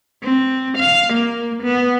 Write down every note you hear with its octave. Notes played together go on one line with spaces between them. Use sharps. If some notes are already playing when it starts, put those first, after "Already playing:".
C4
F5
A#3
B3